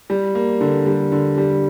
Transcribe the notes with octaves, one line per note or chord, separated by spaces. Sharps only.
G3
A#3
D3
G3
D3
G3